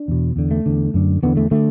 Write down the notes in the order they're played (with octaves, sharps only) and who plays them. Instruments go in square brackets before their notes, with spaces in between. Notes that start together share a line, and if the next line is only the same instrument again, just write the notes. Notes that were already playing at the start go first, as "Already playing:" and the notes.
Already playing: [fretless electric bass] D4
E2 B2
E2 D3
A3
E2 D3
F#2 D3
E2 D3 B3
A3
D3 A3